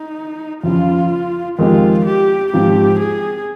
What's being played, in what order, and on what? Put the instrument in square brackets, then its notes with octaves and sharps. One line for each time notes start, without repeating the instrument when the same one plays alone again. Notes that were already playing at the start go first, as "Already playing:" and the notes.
Already playing: [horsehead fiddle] D#4
[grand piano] F2 C#3 F3 [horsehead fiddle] F4
[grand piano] F2 D#3 G#3 C4 G4 [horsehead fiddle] F4
[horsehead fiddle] G4
[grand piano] G#2 F3 C4 [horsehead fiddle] G4
[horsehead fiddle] G#4